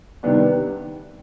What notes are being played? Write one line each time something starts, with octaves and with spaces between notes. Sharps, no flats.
C3 D#3 G3 B3 D4